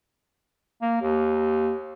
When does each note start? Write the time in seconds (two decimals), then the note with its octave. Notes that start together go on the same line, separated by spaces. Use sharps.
0.82 A#3
1.02 D#2